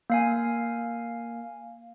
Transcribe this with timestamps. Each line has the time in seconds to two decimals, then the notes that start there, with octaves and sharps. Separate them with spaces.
0.10 A#3 F5 G#5